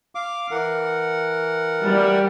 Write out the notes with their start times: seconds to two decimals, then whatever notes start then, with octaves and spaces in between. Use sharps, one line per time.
0.15 F5 D6
0.51 E3 A#4 F#5
1.86 G3